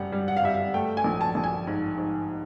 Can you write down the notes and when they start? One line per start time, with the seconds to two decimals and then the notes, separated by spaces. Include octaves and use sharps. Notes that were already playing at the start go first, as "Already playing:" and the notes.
Already playing: F#2 G3 F#5
0.12 G3
0.28 F#5
0.36 F5
0.44 G3 E5
0.54 F5
0.74 A3 G5
0.97 G#5
1.04 A#1
1.21 A5
1.35 A#1
1.44 G#5
1.67 G#2
1.97 G#2